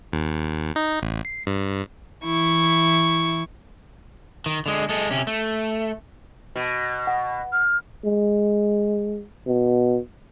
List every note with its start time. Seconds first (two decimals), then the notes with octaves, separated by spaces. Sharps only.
0.12 D#2
0.76 D#4
1.02 A1
1.25 C7
1.47 G2
2.23 E3 E4 C#6
4.46 D#3
4.66 D3 G#3
4.89 G#3 A4
5.11 C3 C#4
5.27 A3
6.56 B2
7.07 F#5
7.52 F6
8.05 G#3
9.47 B2